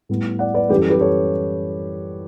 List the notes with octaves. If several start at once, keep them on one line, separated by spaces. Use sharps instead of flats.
A2 G3 B3
D5 F#5
B4 D5
F#2 E3 G3 G4 B4
A4
G4 B4
A4 C#5